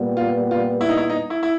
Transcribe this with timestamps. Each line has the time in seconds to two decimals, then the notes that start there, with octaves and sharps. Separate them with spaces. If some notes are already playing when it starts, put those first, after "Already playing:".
Already playing: A#2 G3 B3
0.17 F4
0.51 F4
0.81 E4
0.89 D#4
0.97 E4
1.10 D#4
1.30 E4
1.43 E4